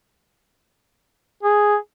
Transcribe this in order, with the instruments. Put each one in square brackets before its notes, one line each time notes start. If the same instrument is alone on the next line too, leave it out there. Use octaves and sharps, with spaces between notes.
[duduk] G#4